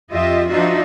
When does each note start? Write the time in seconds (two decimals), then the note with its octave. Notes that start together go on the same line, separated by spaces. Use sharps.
0.12 F2 F4 G4 D#5 E5
0.48 F3 D4 D#4 F4 F#4 E5